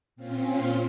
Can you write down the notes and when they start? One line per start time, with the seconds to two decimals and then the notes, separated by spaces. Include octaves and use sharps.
0.16 A#2 C4 C#4 F4